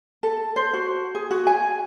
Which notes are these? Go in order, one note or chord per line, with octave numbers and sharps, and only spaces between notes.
A4
C5
F#4
G#4
F#4
G#5